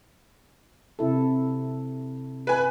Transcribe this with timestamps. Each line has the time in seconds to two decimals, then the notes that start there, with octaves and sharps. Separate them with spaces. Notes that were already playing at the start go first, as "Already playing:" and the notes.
0.99 C3 E4 A4
2.47 B4 G#5